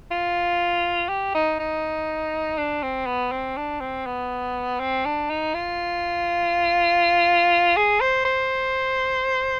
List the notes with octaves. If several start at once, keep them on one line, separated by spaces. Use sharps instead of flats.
F4
G4
D#4
D#4
D4
C4
B3
C4
D4
C4
B3
C4
D4
D#4
F4
G#4
C5
C5